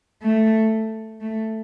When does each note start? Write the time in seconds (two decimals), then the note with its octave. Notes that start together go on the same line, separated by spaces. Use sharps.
0.23 A3
1.21 A3